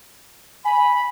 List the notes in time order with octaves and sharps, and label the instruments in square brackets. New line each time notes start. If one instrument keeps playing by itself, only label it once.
[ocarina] G#5 [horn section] B5